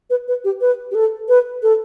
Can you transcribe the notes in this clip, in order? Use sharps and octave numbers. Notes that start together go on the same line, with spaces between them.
B4
B4
G4
B4
G4
A4
B4
A4